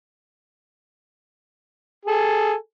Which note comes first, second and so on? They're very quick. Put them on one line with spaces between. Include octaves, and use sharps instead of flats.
G#4 A4 G#5